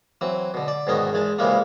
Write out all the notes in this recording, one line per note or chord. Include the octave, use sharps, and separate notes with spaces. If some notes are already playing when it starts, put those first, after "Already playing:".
E3 F#3 C4
B2 D3
D5
G#2 B2 D#3 B3 C#4 D#4
E2 G#3 A5
C#2 C3 E3 G3 G#3 A#3